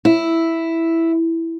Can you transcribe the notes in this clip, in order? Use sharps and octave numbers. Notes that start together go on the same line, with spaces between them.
E4